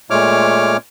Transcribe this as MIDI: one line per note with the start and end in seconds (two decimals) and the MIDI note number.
0.10 0.77 46
0.10 0.77 56
0.10 0.77 57
0.10 0.77 73
0.10 0.77 86
0.10 0.77 89